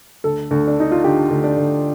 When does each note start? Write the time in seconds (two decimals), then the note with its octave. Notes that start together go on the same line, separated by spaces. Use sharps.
0.24 D2 A4
0.51 D2
0.68 D4
0.77 D3 D#4
0.91 F4
1.04 D3 G4
1.30 D2
1.44 D4
1.57 D2